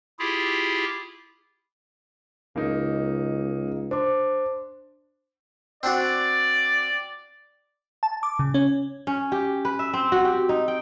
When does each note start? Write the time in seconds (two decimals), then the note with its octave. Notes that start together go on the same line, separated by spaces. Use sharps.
0.19 E4 F4 G4 G#4
2.56 C#2 A#3 D#4
3.91 D4 C5 D6
5.83 C4 D4 F#4 D5
8.03 A5
8.23 D6
8.39 C#3
8.54 C#4
9.07 C#4
9.32 G4
9.65 B4
9.79 E5
9.94 C4
10.12 F#4
10.25 G4
10.49 D#4
10.68 G5